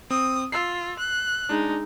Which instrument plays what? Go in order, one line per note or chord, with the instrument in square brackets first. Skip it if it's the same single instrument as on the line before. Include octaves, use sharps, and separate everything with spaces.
[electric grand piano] C4 [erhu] D#6
[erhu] F4 [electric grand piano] E6 C7
[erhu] F#6
[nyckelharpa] G#3 D#4 [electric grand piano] D4